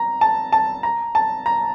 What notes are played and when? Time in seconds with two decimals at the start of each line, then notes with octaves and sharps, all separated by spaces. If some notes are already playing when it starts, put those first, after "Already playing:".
Already playing: A#5
0.21 A5
0.52 A5
0.83 A#5
1.15 A5
1.46 A#5